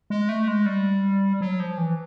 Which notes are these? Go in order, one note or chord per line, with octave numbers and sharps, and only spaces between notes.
G#3
A3
G#3
G3
F#3
F3
E3